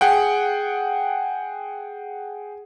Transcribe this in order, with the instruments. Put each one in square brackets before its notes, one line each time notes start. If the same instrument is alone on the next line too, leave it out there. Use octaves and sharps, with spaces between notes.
[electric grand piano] G#4 F#5 G5